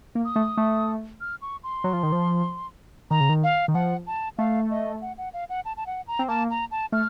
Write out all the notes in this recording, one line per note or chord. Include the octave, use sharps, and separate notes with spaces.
A#3
D#6
A3
A3
F6
C#6
C6
F#3
F3
D#3
F3
D#3 A#5
C#3
D#3
F5
D#3
F3 F#5
A5
A3 F5
D#5
F#5
F#5
F5
F#5
A5
A5
F#5
A#5
C4
A#3 A5
A#5
A5
A3 F6